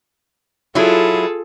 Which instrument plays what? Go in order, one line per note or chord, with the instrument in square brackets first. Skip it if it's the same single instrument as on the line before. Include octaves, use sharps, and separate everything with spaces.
[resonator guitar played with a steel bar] F#3 E4 [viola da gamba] F4 G#4 [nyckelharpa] A4